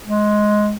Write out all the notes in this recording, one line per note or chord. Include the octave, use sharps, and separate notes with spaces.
G#3